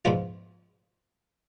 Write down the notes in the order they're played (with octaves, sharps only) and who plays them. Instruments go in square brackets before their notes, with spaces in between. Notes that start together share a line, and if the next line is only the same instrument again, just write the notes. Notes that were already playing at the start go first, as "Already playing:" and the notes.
[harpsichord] G#2 F3 B3 F4